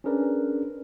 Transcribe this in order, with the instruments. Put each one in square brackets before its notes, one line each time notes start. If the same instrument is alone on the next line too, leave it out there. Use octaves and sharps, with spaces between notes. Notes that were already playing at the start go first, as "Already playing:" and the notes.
[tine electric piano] C#4 D4 G#4 A#4 B4 D5